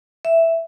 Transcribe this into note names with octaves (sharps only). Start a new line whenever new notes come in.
E5